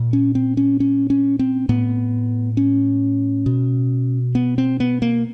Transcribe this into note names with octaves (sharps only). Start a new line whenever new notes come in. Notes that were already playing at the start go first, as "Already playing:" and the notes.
Already playing: A#2
C#4
C4
C#4
C#4
C#4
C4
A2 B3
C#4
B2
B3
C4
B3
A#3